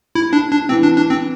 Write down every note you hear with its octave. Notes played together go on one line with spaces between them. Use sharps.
E4
D4
D4
E3 C4
D4
D4
C4